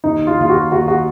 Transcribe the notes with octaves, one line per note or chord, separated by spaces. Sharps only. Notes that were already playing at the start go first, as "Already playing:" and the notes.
D#2 D#4
F4
D#2 F4
F#4
D#2 F#4
F#4